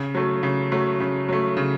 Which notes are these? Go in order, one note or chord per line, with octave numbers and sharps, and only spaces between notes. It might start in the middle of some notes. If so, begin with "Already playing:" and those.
Already playing: C#3
F#3 A3
C#3
F#3 A3
C#3
F#3 A3
C#3